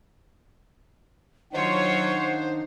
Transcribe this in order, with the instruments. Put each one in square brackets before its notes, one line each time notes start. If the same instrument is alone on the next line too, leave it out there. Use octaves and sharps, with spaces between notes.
[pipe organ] D#3 D4 D#4 [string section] F#3 F4 C#5 [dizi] C5 [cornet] F#5